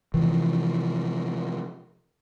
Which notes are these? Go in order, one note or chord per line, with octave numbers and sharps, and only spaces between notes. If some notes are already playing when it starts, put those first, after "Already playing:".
C3 E3 F3